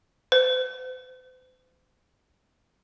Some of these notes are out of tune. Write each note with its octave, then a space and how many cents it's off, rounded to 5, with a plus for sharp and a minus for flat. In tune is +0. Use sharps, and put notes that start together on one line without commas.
C5 -45